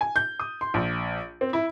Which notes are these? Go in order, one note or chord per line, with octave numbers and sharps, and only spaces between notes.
G#5
G6
D#6
C6
A#1
C4
E4